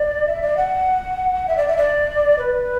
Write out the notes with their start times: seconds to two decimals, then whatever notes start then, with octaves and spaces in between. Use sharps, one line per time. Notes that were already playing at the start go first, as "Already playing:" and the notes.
Already playing: D5
0.27 E5
0.42 D5
0.57 F#5
1.48 E5
1.57 D5
1.68 E5
1.77 D5
2.38 B4